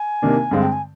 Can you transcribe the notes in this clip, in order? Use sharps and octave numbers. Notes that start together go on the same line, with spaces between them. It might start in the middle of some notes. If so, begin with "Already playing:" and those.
Already playing: G#5
C3 D#3 A#3 D4
G2 D3 G#3 C4 F5
G5
G#5